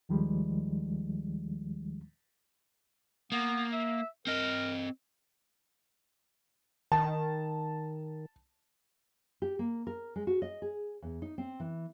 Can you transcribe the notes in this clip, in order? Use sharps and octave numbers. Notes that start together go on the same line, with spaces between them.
D#2 D#3 F3 G3 G#3
A#3 B3
E5
C4 A#4 D#5
D#3 A5
G4
A#3
A#4
G#3
F#4
D#5
G#4
E2
D#4
C4
E3